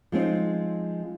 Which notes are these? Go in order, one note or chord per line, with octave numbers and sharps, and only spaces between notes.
F3 G#3 C4 D#4